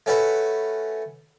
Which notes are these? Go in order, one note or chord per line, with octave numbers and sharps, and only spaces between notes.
A3 C#4 F#4 B4